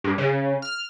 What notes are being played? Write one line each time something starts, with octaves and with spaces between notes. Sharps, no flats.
G2
C#3
F6